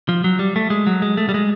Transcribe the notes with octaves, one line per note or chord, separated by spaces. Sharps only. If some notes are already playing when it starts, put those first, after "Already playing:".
F3
F#3
G3
A3
G#3
F#3
G#3
A3
G3
G#3